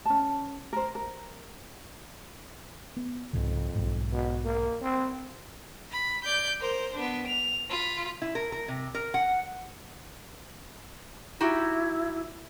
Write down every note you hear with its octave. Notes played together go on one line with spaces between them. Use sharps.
C#4 A5
A#4 C5
A#4
B3
C2 F2 G#2 C#3
B1 G#2
B2
A#3
C4
B5
D5 G6
A#4 C5
B3 D4
F7
F4 B5
E4
A#4
A#4
C3
A#4
F#5
D#4 E4 F#4 G4